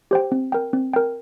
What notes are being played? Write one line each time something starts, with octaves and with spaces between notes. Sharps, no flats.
G4 C5 G5
C4
A#4 G5
C4
A#4 G5